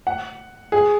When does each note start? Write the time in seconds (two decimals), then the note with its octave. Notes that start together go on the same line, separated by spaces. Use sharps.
0.07 F#5
0.72 G#4